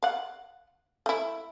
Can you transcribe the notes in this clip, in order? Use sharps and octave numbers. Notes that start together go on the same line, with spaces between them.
F5 F#5
A3 E4